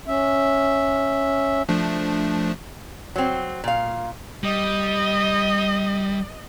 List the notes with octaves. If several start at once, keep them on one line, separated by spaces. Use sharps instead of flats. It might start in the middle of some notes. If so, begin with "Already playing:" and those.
C#4 E5
F3 A3 D4
F#3 C4
A#2 F5
G3 D#5